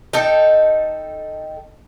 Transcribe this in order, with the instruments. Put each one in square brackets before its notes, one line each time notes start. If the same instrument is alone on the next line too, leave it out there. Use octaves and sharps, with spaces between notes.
[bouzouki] D#4 A4 G5